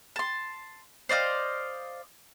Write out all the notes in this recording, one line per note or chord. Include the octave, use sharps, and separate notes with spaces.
A5 C6
C5 D5 D#5 F5